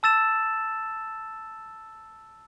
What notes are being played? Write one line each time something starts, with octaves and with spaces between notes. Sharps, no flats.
A5 E6 A6 E7